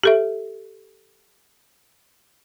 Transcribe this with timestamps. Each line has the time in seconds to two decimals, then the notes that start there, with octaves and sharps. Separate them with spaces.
0.03 G4 A4 E5